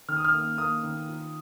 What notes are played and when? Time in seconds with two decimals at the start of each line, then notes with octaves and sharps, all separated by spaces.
0.08 D#3 F6
0.16 D#6
0.25 F6
0.34 A#3
0.58 A#3 D#6
0.83 D#3
1.08 F4